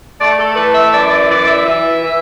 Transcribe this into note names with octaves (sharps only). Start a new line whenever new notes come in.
A3 D5
A4
E3 B4
E5
F#2 D5
D5
E3 D5
E5
E3 E5
E3